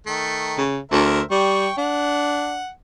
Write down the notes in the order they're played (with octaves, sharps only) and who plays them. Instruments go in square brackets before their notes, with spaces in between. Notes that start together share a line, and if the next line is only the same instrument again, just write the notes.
[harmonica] D#3 A3
[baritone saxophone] C#3
[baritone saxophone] D2 [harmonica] A#4 C5 E5
[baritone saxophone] G3 [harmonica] G5 C#6
[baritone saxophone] D4 [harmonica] F#5